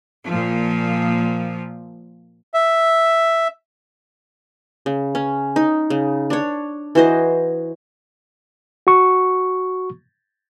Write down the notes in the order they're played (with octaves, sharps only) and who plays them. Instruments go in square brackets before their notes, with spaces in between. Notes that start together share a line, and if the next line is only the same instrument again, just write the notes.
[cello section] A#2 F3
[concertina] E5
[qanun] C#3
C#4
D#4
C#3
D4 C#5
E3 F#4 C5 D#5
[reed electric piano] F#4 C#6